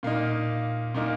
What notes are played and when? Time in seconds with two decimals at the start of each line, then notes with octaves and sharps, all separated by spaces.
0.03 A#2 A#3 D#4
0.95 A#2 A#3 D#4